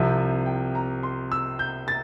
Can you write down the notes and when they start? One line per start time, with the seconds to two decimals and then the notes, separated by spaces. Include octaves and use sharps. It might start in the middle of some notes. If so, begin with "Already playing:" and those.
Already playing: C2 C3 F3 E5
0.18 E5
0.46 G5
0.75 A#5
1.03 C6
1.32 E6
1.59 G6
1.88 A6